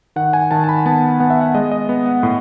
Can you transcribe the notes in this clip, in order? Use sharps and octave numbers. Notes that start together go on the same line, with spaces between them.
D#3 F#5
G#5
D#3 A5
A5
B5
B3 A5
B3 F#5
E5
F#5
G#3 D#5
D#5
B3
F#5
A2